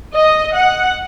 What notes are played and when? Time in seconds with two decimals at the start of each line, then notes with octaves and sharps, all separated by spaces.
0.14 D#5
0.56 F#5